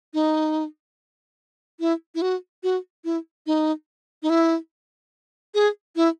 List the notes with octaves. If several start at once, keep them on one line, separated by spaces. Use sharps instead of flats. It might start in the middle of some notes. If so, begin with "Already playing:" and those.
D#4
E4
E4
F#4
F#4
E4
D#4
D#4
E4
G#4
E4